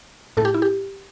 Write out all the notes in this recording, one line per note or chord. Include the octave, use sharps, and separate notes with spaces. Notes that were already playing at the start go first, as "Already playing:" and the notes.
A2 A3 A4
G4
E4
G4